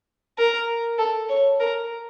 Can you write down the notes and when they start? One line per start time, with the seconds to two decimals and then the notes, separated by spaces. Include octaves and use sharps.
0.38 A#4
0.98 A4
1.29 C#5
1.60 A#4